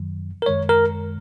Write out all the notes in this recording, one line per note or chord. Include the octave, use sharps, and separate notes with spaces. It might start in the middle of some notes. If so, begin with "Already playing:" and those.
Already playing: F#2 D#3 F#3
A#4
F#2 D#3 G#3 C#5
A#4